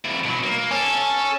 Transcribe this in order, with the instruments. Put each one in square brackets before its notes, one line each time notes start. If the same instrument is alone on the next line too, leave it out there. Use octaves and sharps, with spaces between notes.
[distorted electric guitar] F2 E4
B2 F#3
A#3
[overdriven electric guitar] C#4 [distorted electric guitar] A4